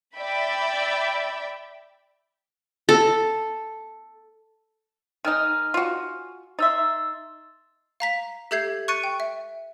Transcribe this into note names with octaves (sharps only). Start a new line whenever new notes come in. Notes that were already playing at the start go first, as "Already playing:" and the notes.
D5 E5 G5 B5
A4
D#3 D#4 G#5 F6
F4 F#4
D#4 E5 C6 E6 A6
F5 A#5 B6
G4 A4 E5 G6 G#6 C7
C#6 F#6 A6 C#7 D#7
G5
E5